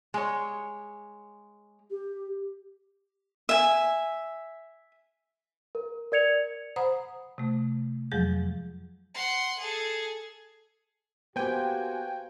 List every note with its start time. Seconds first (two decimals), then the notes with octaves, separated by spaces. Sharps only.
0.14 G#3 C#5
1.91 G4
3.49 E5 G#5
5.75 A#4
6.12 A#4 D5 G#6 C#7 F7
6.76 C5 F#5 A#5 B5 D#6
7.38 C3 A3
8.11 F2 F3 F#3 G#3 G#4 G6
9.14 F#5 C6
9.59 G#4 A4
11.36 A#3 B3 F#4 G4 C5 G5 G#5